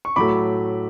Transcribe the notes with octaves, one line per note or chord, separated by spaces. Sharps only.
C#6
A2 F#3 A3 B5 D6